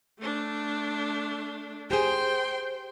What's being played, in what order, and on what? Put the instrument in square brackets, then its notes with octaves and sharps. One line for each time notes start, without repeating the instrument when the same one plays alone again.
[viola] A3 D4
[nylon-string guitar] G4 G#4 [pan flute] C5 [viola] G5 C6